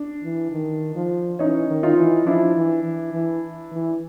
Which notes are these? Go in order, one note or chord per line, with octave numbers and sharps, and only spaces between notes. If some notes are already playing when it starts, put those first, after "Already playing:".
Already playing: D4
E3
D#3
F3
E3 C#4 D#4
D#3
D#4 F4
E3
F3 D4 E4
E3
E3
E3
E3